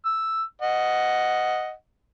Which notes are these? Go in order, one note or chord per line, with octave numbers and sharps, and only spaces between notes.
E6
D#5 F#5